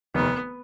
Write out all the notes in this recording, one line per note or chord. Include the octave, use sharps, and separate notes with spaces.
F1 D#2 D#3 B3